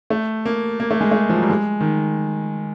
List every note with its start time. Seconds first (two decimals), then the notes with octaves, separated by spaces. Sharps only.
0.10 A3
0.45 A#3
0.80 A#3
0.91 A3
1.01 G#3
1.11 A3
1.29 F3
1.36 F#3
1.42 G3
1.50 G#3
1.80 D#3